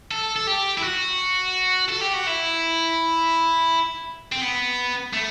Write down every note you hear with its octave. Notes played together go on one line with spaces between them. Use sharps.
A4
A4
G4
E4
F#4
A4
G4
F#4
E4
C4
B3
A3